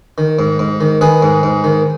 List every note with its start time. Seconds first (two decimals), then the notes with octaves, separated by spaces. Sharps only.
0.18 D#3
0.39 G#2
0.59 G#2
0.80 D#3
1.01 D#3 G#4 B4
1.22 G#2
1.43 G#2
1.64 D#3